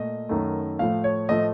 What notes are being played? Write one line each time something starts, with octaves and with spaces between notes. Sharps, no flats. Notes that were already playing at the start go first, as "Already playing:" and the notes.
Already playing: A#2 A3 D#5
F#2 D#3 A3
A2 F3 A3 F5
C#5
A2 F3 A3 D#5